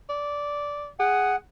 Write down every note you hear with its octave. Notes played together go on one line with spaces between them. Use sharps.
D5
G#4 F#5